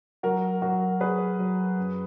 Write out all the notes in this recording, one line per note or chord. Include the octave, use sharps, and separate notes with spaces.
F#3 F#4 A#4
F#3 F#4 A#4
F#3 G#4 B4
F#3
F#2